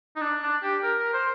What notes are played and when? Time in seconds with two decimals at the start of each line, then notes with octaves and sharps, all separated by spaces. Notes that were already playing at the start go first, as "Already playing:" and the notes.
0.16 D#4
0.22 D4
0.42 D4
0.63 G4
0.83 A#4
0.99 A#4
1.14 C5